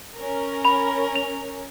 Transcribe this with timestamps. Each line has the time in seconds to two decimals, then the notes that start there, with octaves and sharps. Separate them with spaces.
0.16 C#4 A#4
0.65 B5 F7
1.16 F7